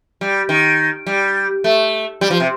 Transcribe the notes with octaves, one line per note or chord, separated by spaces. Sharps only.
G3
D#3
G3
A3
G3
F3
C3